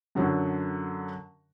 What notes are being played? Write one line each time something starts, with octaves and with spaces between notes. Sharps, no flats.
F#2 D3 F#3